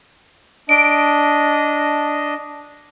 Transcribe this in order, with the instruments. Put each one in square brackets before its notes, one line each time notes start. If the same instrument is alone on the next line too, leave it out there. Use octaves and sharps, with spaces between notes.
[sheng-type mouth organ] D4 D#5 [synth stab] D7